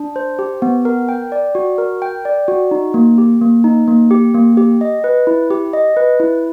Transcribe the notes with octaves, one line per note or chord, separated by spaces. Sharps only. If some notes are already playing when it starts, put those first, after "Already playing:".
Already playing: D4
C5
G4
B3
A#4
G5
D5
F#4
A#4
G5
D5
F#4
D#4
A#3
G4
A#3
D#4
A#3
G4
A#3
G4
D#5
B4
E4
G4
D#5
B4
E4